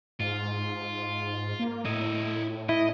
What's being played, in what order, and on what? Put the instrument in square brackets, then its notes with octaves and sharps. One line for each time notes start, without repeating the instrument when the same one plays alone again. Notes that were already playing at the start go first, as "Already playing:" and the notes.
[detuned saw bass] G#2 [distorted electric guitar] F4
[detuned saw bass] A#3
[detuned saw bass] A2 [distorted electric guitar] E4 D#5
[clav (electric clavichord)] E4 [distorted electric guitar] D#5